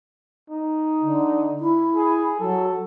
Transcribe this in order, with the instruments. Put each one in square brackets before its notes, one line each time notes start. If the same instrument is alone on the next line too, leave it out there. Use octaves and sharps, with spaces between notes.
[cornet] D#4
[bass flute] D3
E4
[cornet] G#4
[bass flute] F#3 [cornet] A4